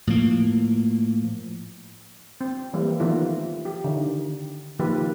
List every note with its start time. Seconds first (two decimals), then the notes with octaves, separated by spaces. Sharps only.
0.07 A2 F3 A#3
2.41 C4
2.73 E3 G3 A#3
3.00 D#3 F3 A3 B3 E4 F4
3.65 G4
3.84 D3 D#3
4.79 D#3 F3 A#3 G4 B4